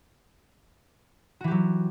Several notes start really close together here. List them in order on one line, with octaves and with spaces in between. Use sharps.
F#4 E3 G4 F#3